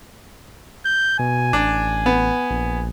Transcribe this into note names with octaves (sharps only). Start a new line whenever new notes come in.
G6
B2 G#5
A1 D4
B3
A#1